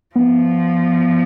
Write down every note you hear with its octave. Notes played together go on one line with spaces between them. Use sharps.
F3 B3